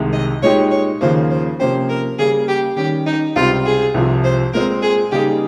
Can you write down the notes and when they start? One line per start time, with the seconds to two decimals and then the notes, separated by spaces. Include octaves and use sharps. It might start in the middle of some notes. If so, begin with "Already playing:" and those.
Already playing: C2 C3 D#3 G#3
0.13 D#5
0.42 A#2 G#3 D#4 G4 C#5
0.71 C#5
1.01 D#2 C#3 F3 A#3 C5
1.30 C5
1.60 C3 F3 A#3 C#4 G4 C5
1.89 A#4
2.19 C#3 G3 A#3 G#4
2.48 G4
2.76 D#3 G3 C#4 G4
3.06 D#4
3.36 C#2 C3 G3 C4 F4
3.66 G#4
3.94 C2 C3 F3
4.24 C5
4.54 A#2 G#3 C4 A#4
4.83 G#4
5.12 C#3 G3 A#3 D#4 G4 G#4